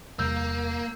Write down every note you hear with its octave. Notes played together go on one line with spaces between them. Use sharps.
E2 C3 G3 A#3 E6 G6